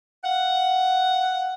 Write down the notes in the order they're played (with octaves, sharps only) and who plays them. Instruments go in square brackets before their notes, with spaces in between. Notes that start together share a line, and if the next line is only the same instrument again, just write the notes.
[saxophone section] F5 F#5